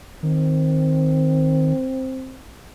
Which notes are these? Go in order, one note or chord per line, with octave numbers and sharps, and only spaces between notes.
D#3 C4